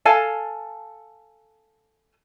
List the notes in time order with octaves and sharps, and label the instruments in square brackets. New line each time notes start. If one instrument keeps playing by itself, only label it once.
[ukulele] A4 F5 G#5 A5